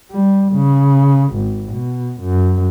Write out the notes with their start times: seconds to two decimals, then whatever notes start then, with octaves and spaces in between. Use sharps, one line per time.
0.11 G3
0.53 C#3
1.35 G#1
1.73 B2
2.21 F#2